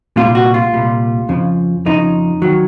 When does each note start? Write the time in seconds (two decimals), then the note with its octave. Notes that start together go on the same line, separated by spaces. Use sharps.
0.16 C2 A#2 G3 F4
0.35 F#4
0.54 F4
0.72 C2 A#2 G3
1.29 F2 C#3 F3
1.86 F2 C#3 F3 D#4
2.42 D#3 F#3